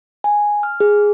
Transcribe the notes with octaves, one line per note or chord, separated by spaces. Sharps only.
G#5
F6
G#4